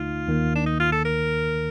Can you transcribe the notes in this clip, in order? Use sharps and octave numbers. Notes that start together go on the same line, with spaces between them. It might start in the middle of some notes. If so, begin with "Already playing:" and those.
Already playing: D2 D3 A3 D#4 F4
D#2 D#3 A#3
D4
D#4
F4
A4
A#4